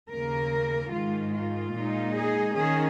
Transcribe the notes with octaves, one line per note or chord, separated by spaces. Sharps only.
D#2 C#3 A#3 A#4
G#2 D#3 G#3 F4
F4
A#2 G#3 D#4
G#4
D#3 C#4 G#4